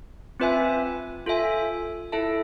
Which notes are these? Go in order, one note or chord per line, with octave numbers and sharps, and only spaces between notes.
C4 F4 B4 E5 G#5
F4 A4 E5 G#5
E4 A4 E5 A5